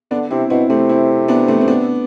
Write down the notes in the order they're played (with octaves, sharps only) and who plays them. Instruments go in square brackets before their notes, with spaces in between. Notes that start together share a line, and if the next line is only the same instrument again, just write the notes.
[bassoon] D3 [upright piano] B3 D4
[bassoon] C3 [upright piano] C4 E4
[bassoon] B2 [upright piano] C4 E4
[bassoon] C3 [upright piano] A3 C4
[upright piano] C4 E4
B3 D4
A3 C4
C4
B3 D4